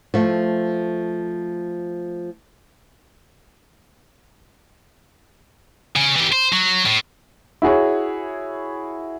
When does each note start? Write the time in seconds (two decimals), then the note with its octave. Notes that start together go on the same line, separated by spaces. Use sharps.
0.14 F3 A3
5.96 C#3
6.16 E3 G4
6.33 C5
6.53 F#3
6.86 A2
7.62 E4 F#4 G#4 C#5